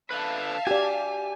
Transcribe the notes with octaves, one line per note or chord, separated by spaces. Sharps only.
D3 B4 E5 F5 A5
F#4 G4 D5 G#5